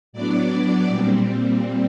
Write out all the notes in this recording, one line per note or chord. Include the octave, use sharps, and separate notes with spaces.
A2 F#3 B3 D4 D5
A#2 G3 C4